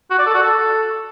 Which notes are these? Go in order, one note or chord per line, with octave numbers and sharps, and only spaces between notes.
F#4
D5
A4
F#4
A4